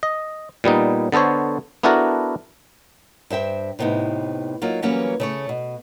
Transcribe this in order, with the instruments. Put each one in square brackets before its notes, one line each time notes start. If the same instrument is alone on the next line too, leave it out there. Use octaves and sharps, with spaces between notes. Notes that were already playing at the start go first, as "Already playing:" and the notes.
[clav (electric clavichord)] D#5
A#2 G3 B3 D#4
D3 B3 A4 C5 C#5
B3 D4 E4 F#4 A4 A#4
[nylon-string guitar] G2 C5 E5 G5
A2 C3 B3 D#4 E4
F#3 A#3 D#4 F4
E3 F#3 G3 A#3 B3 C#4
C#3 A3 C#5
B2